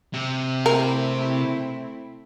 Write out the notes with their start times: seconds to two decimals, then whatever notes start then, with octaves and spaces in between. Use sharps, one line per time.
0.14 C3
0.66 A3 C4 E4 A#4